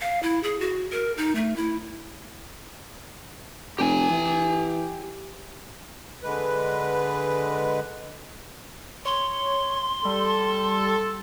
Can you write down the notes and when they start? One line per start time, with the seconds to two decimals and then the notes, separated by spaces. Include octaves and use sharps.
0.01 F5
0.23 E4
0.43 G#4
0.60 F#4
0.92 A#4
1.17 D#4
1.35 A3
1.56 E4
3.79 F1 G4 G5 G#5
4.10 E3
6.23 D3 G#3 B4
9.05 C#5 C6
10.05 G3 A4